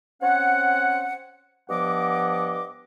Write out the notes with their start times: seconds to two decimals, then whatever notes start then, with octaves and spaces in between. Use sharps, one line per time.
0.22 C4 C#4 C#5 F#5
1.70 G2 F3 B3 D#5 F#5 D6